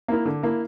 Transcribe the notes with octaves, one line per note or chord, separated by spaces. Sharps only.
A#3 E4 A#4
D3
A#3 E4 A#4